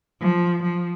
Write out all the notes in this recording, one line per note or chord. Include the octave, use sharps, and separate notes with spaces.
F3
F3